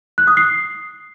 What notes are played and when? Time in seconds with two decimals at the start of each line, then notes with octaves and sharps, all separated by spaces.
0.18 F#6
0.27 D#6
0.37 C7